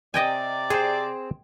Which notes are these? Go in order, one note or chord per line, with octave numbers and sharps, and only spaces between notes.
C3 D5 D#5 G5 G#5
C4 G#4 C5